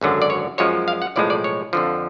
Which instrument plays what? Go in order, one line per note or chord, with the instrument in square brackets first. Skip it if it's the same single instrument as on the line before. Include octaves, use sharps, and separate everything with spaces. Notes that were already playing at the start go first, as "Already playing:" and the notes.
[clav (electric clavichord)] G#1 F#2 D3 F#3
D5
C#5
F#2 F3 G#3 C#5
F5
F#5
B1 A2 F3 G#3 D5
D5
C#5
F2 D3 F3